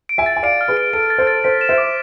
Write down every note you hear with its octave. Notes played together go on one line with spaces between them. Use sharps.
D7
E5 G#5
A6
G#5
D5 F5 D7
F6
G#4 B4
D7
A4 D7
A6
A4 C5
A6
A4 C5 B6
E7
C5 E5
D6